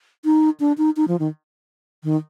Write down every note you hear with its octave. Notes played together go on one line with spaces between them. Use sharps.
D#4
D4
D#4
D#4
F3
D#3
D#3